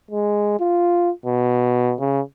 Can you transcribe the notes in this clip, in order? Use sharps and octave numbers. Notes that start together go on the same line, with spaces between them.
G#3
F4
B2
C#3